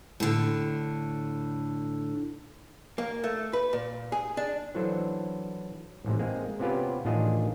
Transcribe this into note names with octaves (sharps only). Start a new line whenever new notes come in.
A2 D3
A#3
A3
B4
A#2
G#4
D4
E3 F#3 D4 A4 C5
A1 G#2 C3
G#3 A#3 C4 G#4
C3 B3 C#4 F4 G4 B4
A1 D#3 D4 F4 G#4 D#5